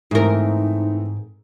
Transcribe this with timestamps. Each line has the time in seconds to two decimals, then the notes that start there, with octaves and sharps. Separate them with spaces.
0.11 G#2 E3 A3 C4 D#4 A#4